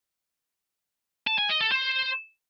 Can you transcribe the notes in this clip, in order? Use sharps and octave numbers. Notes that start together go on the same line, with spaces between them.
A5
G#5
D#5
A4
C5